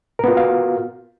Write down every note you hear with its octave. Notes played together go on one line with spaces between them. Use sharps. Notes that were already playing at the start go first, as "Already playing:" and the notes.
B3 F4 F#4 A#4 F5